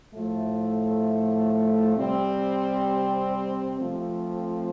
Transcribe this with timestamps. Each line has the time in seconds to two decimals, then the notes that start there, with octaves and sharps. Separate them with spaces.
0.15 A2 F3 A3
1.97 C3 G3 C4
3.78 F3 A3 C4